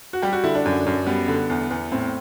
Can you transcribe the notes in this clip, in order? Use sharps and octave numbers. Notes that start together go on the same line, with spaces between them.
F#4
G3 G4
F#4
D3 E4
D4
F#2
F#2
G3 B3
D3
E2
E2
A2 C4